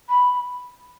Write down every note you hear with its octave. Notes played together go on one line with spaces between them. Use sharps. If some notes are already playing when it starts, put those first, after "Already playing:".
B5